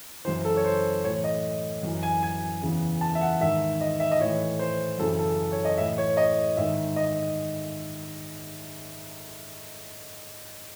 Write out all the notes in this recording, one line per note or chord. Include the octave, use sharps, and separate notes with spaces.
F#2 C#3 E3 C5
A4
C#5
C5
A2 E3 C#5
D#5
F#2 E3
G#5
G#5
E2 C#3 E3
A5
E5
F#5
G#2 D#3 E5
D#5
E5
D#5
A2 E3 C#5
C5
F#2 C#3 E3 A4
A4
C#5
D#5
A2 E3 E5
C#5
D#5
G#2 D#3 E5
D#5